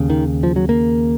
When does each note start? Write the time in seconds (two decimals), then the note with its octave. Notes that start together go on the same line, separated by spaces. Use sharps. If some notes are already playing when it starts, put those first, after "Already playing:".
Already playing: D#2 C#3
0.10 D#3
0.43 F3
0.56 F#3
0.69 A#3